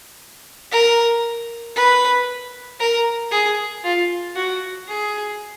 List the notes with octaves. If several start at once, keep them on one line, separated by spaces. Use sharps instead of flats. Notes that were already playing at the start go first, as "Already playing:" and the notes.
A#4
B4
A#4
G#4
F4
F#4
G#4